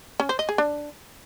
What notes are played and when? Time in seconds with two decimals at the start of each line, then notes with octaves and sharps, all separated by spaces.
0.20 C#4
0.29 C5
0.39 D#5
0.49 G#4
0.58 D4